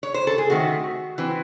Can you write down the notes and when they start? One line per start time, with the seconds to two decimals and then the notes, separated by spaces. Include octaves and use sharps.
0.03 C#5
0.14 C5
0.27 A4
0.38 G#4
0.50 D#3 A3 C4 F#4
1.18 E3 C4